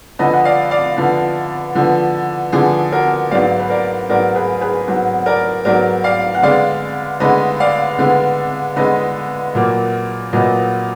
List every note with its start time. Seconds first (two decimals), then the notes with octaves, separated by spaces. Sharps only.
0.19 D3 F3 B3 B4 D#5
0.33 F#5
0.45 D5 F5
0.71 D5 F5
0.96 D3 F3 B3
1.75 D3 F3 B3
2.52 D3 F3 B3 G#4
2.92 F#4 A#4
3.31 G#2 F#3 B3 D5 F5
3.59 B4
3.70 A#4 D5
4.09 G#2 F#3 B3 A#4 D5
4.35 G#4 B4
4.61 G#4 B4
4.88 G#2 F#3 B3
5.26 A#4 D5
5.65 G#2 F#3 B3 A#4 D5
6.04 D5 F5
6.35 F#5
6.42 D3 G#3 B3 D5 F5
7.20 D3 G#3 B3 B4 D#5
7.60 D5 F5
7.98 D3 G#3 B3
8.76 D3 G#3 B3 B4 D#5
9.55 A#2 F#3 A#3
10.33 A#2 F#3 A#3 B4 D#5